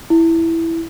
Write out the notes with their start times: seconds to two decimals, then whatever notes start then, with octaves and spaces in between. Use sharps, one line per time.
0.10 E4